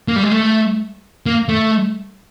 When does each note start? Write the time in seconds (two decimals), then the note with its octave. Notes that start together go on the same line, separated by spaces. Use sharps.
0.08 A#3
0.16 G3
0.23 G#3
0.31 A3
1.26 A#3
1.49 A3